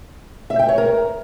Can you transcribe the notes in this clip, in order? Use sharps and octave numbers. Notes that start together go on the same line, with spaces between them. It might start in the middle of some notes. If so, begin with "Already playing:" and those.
E5
G5
C#5
A#4